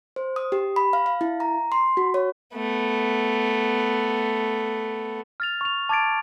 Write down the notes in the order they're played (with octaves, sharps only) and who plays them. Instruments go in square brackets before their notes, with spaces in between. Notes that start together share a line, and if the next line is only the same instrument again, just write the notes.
[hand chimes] C5
D#6
G4
B5
F5
F5
E4
A#5
C6
F#4
C#5
[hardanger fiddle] A3 B3
[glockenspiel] F6 A6 F7
C#6 F7
A5 D6 G#6 A6 D7